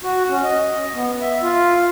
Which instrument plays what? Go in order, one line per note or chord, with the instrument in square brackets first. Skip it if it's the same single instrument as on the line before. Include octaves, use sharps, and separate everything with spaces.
[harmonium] F#4
C#4
D#5
B3
E5
F4